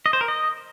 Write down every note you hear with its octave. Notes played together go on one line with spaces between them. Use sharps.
D#5
C5
A#4
D#5